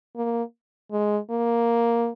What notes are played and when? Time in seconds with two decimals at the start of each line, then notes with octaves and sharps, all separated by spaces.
0.16 A#3
0.92 G#3
1.30 A#3